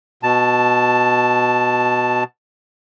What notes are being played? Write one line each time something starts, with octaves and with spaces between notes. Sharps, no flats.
B2 A5